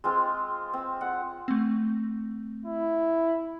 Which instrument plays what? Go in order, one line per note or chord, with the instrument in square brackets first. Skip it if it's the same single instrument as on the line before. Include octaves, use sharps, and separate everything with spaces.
[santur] G#3 C4 F4 C5
C4
F#5
[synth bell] A3 C4
[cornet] E4